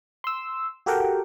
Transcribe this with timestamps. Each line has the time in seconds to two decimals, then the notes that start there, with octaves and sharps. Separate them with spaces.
0.24 C6 E6
0.86 F#4 G4 A4 A#4 F#5 G5